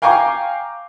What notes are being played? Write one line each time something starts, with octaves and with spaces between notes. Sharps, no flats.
F5 G5 G#5 A#5 C#6 D6